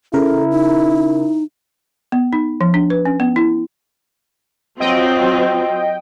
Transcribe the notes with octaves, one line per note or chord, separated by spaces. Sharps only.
C#3 E4 A4 A#4
D#4
B3
D#4
F3
D4
B4
C#4
B3
E4
F#3 C4 F4 D#5 G5